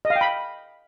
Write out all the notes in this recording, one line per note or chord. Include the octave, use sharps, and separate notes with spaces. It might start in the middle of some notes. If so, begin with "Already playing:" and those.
D#5
F5
G5
B5